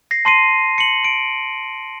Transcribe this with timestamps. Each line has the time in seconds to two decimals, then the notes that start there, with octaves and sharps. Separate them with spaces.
0.11 A#6 C7
0.25 A5 C6 C7 D#7
0.78 C#7 F#7
1.04 D7